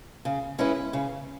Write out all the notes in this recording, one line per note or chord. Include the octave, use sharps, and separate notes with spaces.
C#3
G#3 C#4 E4 B4
C#3